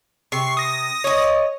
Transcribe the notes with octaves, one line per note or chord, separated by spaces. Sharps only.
C3 C#6 C7
D#6 A#6
C#5 D#5